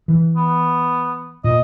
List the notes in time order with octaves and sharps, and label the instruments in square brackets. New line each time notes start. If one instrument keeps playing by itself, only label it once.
[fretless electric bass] E3
[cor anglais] B3
[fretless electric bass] A#2 [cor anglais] D#5